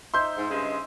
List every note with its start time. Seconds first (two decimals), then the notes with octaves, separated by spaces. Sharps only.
0.14 D#4 C5 E5 C6 G6
0.37 G#2
0.50 G2 C#3 G#3